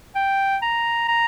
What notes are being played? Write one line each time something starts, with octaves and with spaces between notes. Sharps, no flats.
G5
A#5
A#5